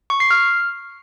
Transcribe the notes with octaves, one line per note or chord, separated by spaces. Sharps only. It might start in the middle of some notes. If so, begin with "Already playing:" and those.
C#6
C7
F6